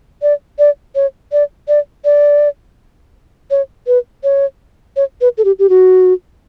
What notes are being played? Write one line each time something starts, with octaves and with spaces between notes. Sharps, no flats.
D5
D5
C#5
D5
D5
D5
C#5
B4
C#5
C#5
B4
A4
G4
G4
F#4